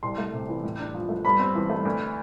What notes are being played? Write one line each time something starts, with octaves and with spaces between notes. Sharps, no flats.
C2 C6
A3
C3
E3
A2
D4
F3
A3
G2 B5
C4
E3
A3
D2